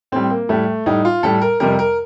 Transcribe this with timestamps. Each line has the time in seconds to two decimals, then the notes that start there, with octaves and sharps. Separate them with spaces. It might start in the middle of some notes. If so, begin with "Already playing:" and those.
0.12 A2 G3 C4
0.30 A#3
0.49 A2 G3 A3
0.86 A2 G3 D#4
1.05 F4
1.23 A2 G3 A4
1.42 A#4
1.60 F2 C3 G3 A#4
1.79 A#4